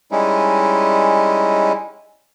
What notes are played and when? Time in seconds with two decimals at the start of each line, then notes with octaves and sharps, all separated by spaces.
0.12 G3 G#3 C#4 D#4 E4